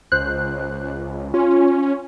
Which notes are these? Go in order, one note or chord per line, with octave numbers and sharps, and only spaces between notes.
C#2 C5 F#6
C#4 F4